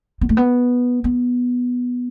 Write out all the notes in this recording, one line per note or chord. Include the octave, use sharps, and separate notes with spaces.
B3
A3
B3
B3